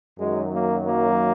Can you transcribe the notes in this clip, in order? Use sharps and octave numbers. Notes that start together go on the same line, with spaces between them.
F#2 D#3 F#3 G#3
A#3
A#3